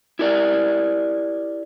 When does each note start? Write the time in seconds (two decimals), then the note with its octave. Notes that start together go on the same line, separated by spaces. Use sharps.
0.19 E4 G4 A#4 D5